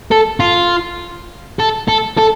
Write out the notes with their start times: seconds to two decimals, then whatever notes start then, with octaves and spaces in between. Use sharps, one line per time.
0.11 A4
0.40 F4
1.59 A4
1.88 A4
2.18 A4